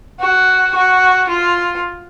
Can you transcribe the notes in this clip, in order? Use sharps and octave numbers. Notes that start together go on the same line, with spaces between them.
F#4
F#4
F4